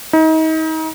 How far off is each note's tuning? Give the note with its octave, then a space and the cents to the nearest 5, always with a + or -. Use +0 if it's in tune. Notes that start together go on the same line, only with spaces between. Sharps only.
D#4 +35